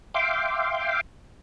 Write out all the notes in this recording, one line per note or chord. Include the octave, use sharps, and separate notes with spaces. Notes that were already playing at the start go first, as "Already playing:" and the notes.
E5 F5 G5 C6 D6